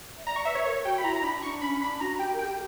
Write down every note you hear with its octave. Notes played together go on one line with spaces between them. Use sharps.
E5
D5 A#5
C#6
B4 E5
C#5
A#4 C#5
F#4 G5
B5
E4 A#5
A#5
D4 B5
D4 C#6
C#4 B5
D4 B5
F#4 A#5
G4 G5
A#4
G5
G4